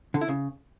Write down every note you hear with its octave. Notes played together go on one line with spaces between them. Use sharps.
D3
E4
C#3